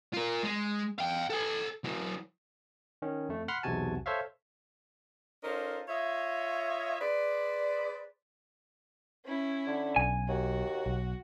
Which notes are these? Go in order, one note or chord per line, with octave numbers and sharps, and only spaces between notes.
F4 A#4
G#3
F5 G5
A4 G#5
F#3 E4
D#3 C#4
F2 A3
F#5 B5 C6 F6
B1 E2 C3 F#4 G#5 A5
A4 C5 C#5 E5 F5
C#4 D#4 F4 A4 A#4 C5
F4 C#5 D#5 E5
G#4 B4 C5 D5
C#4 E4
D3
B1 G#5
D#2 F#4
B1